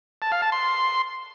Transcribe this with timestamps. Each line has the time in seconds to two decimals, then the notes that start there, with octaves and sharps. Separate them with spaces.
0.22 A5
0.32 F5
0.42 A5
0.52 C6